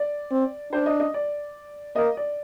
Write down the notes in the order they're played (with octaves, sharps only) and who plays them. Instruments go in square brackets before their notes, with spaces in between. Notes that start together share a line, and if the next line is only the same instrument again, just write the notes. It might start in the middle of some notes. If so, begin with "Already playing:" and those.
Already playing: [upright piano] D5
[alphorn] C4
[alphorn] D4 [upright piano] C5
[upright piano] D#5
D#5
D5
[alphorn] A#3 [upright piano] D#5
[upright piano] D5